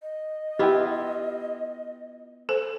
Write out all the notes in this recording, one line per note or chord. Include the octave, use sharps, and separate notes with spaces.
D#5
B3 E4 F4 G4 G5
A4 C5